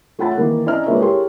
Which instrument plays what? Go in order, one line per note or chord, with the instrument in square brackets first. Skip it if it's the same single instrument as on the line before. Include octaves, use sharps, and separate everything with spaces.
[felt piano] A3 F4 C#5 F#5 B5 A6
D#3 E3 A#3
C#4 E4 D5 D#5 A#5 F6
G#3 A#3 F4 B4 C#5 E5
E4 G4 G#4 A#4 C#5 C6